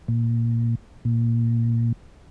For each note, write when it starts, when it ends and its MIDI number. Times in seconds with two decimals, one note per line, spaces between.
0.08 0.75 46
1.05 1.92 46